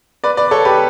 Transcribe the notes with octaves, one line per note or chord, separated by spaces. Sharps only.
B4 D5
B4 D5
A4 C#5
G4 B4